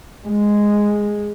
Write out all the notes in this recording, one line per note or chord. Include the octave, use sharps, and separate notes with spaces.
G#3